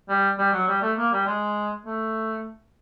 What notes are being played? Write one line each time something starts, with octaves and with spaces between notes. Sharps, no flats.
G3
G3
F#3
G3
A3
A#3
G3
G#3
A3